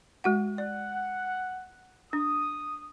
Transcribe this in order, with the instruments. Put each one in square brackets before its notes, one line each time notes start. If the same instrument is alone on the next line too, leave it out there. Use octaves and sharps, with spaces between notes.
[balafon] G#3 F#4 F#5
[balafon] D5 [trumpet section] F#5
[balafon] D4 [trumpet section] D#6